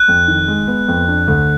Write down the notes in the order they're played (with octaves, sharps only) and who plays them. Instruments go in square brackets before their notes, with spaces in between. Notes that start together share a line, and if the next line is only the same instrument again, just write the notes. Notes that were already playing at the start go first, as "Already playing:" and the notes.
Already playing: [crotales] F#6
[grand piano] F2
D#3
G#3
B3
F2
D4
D2